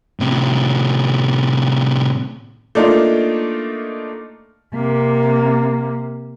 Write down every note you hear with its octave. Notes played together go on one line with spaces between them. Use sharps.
A2 C3
A3 A#3 D4 D#4 F4
C3 A#3